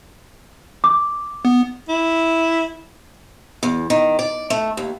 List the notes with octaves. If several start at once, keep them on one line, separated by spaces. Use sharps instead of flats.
D6
B3
E4
E2
D#3
D5
A3
D#2